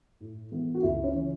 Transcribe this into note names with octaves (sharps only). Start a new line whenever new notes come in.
A2
E3 G#3 B3
F#4
C#2 E4
C#4
C#3 E3